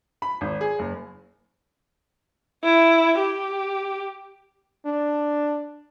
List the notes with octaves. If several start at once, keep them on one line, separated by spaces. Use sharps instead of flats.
B5
G#1
G#4
F#1
E4
G4
D4